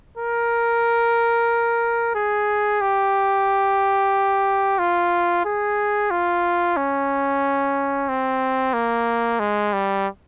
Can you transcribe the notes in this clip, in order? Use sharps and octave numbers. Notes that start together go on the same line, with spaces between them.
A#4
G#4
G4
F4
G#4
F4
C#4
C4
A#3
G#3
G3